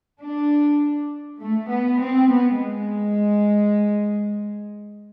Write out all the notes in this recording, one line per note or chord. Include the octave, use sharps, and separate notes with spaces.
D4
A3
B3
C4
B3
G#3